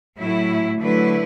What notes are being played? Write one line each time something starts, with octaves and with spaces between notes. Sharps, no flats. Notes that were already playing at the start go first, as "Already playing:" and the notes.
A2 F#3 A3 E4
D3 F#3 A3 E4 B4